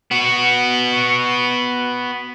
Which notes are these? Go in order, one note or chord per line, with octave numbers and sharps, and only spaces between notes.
B3 F#4